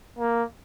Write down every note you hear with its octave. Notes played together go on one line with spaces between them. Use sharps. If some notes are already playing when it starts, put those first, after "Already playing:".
A#3